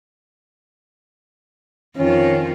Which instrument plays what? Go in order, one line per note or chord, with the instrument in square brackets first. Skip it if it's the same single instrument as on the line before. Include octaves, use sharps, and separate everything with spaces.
[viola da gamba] F2 D#3 F4 [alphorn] C#4